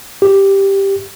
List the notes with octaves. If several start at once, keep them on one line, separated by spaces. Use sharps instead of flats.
G4